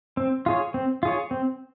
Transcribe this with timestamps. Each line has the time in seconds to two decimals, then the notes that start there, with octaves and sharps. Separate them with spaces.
0.17 C4
0.46 F4 G#4 C#5
0.74 C4
1.03 F4 G#4 C#5
1.31 C4